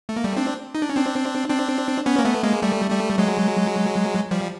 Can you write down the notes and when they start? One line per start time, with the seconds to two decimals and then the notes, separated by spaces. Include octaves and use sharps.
0.09 A3
0.16 A#3
0.24 G3 A3
0.37 C4 D4
0.75 D#4
0.82 D4
0.90 C#4
0.96 C4 D4
1.49 C4 D4
2.06 B3 C#4
2.19 A#3
2.25 A3 B3
2.43 G#3 A#3
2.62 G3 A3
2.90 G3 A3
3.18 F#3 G#3
4.31 F3 G3